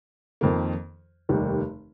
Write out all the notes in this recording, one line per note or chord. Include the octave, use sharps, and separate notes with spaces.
F2 D#3 A#3
F1 D#2 D#3 G3